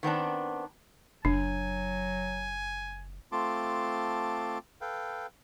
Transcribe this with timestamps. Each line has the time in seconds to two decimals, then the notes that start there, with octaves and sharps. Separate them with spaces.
0.03 D#3 B3 C4 D4
1.25 F#1 F#3 D4 G#5
3.32 A3 C4 F4 A5 C6 D6
4.81 A4 B4 F5 G5